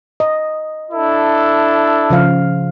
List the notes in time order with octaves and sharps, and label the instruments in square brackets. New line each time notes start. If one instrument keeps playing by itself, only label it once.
[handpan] D#5
[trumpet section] D4 E4 A4
[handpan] C#3 F3 F5